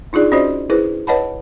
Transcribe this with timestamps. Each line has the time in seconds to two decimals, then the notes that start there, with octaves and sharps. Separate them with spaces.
0.13 D4 D#4 F4 G#4 D5
0.32 C#4 D4 F#4 C5 D5 D#5
0.70 E4 G#4 B4 C5
1.07 B4 C#5 D#5 F#5 A5 B5